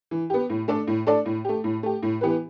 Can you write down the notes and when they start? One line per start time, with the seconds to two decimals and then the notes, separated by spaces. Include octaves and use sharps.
0.11 E3
0.30 B3 G4
0.50 A2
0.68 A3 D4 A4 D5
0.87 A2
1.07 A3 D4 A4 D5
1.26 A2
1.45 A3 G4
1.64 A2
1.83 A3 G4
2.03 A2
2.21 E3 B3 G4 B4